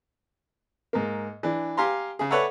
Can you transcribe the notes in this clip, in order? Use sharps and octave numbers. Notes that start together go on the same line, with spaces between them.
G#2 A#3
E3 D4
G4 F5 G#5 A#5 C6
C#3 G#4
A4 B4 C#5 D5 E5 F#5